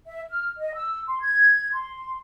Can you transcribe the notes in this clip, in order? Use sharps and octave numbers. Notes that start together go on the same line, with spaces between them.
E5
F6
D#5
E6
C6
G#6
C6